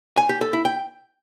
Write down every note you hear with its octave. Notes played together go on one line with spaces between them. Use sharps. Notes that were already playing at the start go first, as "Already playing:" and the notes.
G#5
G4
A4
E4
G5